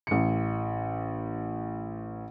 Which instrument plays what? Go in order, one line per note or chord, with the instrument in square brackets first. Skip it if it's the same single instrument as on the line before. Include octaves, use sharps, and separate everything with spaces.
[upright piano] A1 C#7